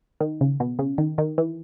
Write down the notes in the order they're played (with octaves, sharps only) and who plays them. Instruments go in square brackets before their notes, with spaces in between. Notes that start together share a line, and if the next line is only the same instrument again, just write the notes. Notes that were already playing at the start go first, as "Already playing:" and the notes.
[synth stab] D#3
C#3
B2
C#3
D#3
D#3
E3